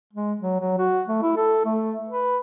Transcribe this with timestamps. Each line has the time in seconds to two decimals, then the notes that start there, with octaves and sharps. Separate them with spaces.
0.13 G#3
0.40 F#3
0.60 F#3
0.78 F#4
1.08 A3
1.22 E4
1.37 A4
1.65 A3
2.09 B4